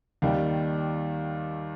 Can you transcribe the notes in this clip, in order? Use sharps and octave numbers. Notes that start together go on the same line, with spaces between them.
D#2 D#3 G3